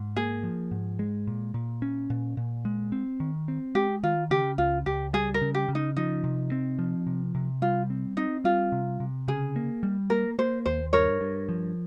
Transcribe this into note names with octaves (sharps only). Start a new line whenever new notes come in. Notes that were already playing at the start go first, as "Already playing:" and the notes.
Already playing: G#2
A#3 G#4
F3
G#2
G#3
A#2
A#2
C#4
A#2
A#2
G#3
C4
D#3
C4
G#3 G4
D#3 F4
C#3 G4
C#2 F4
C#2 G4
G3 G#4
A#4
C#3
G4
C#3
D#4
F3 D#4
C3
C4
F3
C3
C3
G3 F4
C4
C4 D#4
G3 F4
C3
C3
C#3 G#4
A#3
G3
A#3 A#4
A#3 C5
D#2 C5
G2 A#4 C#5
G2
F3